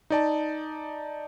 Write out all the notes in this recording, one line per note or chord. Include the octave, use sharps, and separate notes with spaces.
D#4 D5 A5